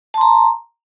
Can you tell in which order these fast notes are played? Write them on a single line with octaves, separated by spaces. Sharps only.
A5 C6 A#5